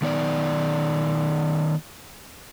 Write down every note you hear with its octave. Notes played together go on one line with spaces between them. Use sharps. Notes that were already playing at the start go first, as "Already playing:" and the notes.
D#3 B3 D#4 D5 G5